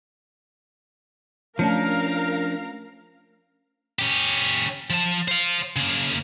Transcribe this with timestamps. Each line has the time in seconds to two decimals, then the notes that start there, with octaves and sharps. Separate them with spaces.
1.59 F3 A3 C#4 D4 A#4 F5 A5 A#5
3.99 C#4 G4
4.90 F3 A5
5.28 C5 F5
5.76 C#3 A#3